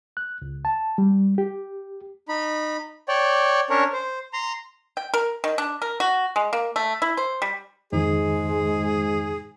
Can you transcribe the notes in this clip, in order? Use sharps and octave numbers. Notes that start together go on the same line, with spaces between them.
F#6
C#2
A5
G3
G4
D#4 B5
C#5 D5 G5
C#4 D4 A#4 C#5
C5
A#5 C6
G5
A#4
D#3
D4
A#4
F#4
G#3
A#3
A3
E4
C5
G3
F2 G#2 D#3 G#3 G#4